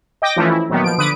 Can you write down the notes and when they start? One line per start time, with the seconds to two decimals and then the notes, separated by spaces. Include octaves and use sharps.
0.22 D#5 G5 D6 A#6
0.36 E3 F3 A3 C#4
0.49 E4
0.69 A#2 D#3 F#3 B3
0.84 F3 D7
0.98 D3 B4 D#6 D7